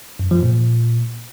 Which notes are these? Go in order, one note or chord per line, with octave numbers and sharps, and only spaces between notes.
F#2
F3
A#2